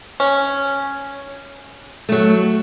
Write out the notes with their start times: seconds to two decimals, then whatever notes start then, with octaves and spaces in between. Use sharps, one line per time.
0.20 C#4
2.09 F#3 A3